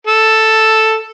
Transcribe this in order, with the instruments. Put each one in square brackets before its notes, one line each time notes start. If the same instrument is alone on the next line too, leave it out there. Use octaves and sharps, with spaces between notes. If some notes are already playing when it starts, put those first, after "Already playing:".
[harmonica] A4